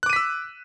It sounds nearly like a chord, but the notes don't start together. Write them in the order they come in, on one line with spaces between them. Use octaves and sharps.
F#6 D6 D#7 B6 E6